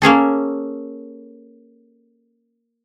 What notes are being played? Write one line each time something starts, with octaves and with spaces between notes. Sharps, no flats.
A#3 C#4 G#4 A4